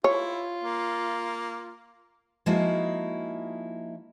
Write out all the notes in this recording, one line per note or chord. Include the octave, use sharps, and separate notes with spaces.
E4 F4 C#5
A#3
F3 G#3 A#3 D#4 E4 F#4